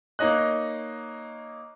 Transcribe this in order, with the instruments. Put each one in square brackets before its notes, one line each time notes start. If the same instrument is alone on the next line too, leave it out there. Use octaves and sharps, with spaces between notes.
[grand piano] A#3 D#4 C#5 D#5 F#6